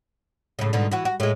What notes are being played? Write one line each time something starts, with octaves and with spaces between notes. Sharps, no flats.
A2 C#3
G#2 B2 D3
E3 F#4
F#4
A2 G#3